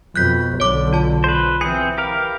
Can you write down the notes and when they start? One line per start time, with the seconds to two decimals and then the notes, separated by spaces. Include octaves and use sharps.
0.16 F2 B2 F#6 G6 B6
0.60 B1 D3 C#5 D6
0.93 F4 A5
1.24 B4 C5
1.61 E3 C4 G#4 C#7
1.98 G4 A#4 F5